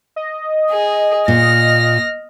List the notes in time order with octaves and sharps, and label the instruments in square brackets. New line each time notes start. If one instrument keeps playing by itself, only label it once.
[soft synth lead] D#5
[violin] G#4
[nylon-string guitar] A#2 [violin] F6 A#6